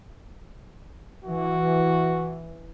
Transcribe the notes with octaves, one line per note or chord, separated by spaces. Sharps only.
E3 F#4